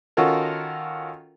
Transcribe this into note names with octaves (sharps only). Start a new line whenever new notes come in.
D#3 C#4 F4 F#4 A4 A#4